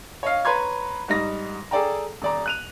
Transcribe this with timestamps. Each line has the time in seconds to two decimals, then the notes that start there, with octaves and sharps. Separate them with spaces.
0.23 C#5 D#5 F5
0.45 B4 C#5 A#5 C6 G#6
1.08 G#2 G3 D#4 A#6
1.71 G#4 A4 D5 G5 A#5
2.22 D#1 D5 A#5
2.46 F#6 D#7 F7